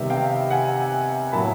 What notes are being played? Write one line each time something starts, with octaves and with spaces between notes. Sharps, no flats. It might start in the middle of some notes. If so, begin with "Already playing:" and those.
Already playing: C3 D#3 G3 B3 E5
F5 G5
F#5 G#5
A2 F#3 A#3 A5 B5